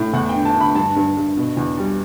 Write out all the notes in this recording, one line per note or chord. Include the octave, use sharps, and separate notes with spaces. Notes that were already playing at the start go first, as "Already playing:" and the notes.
Already playing: A2
E2 F#5
G5
D3
A5
D3
B5
G2 A5
G2
G2
B2
E2
G3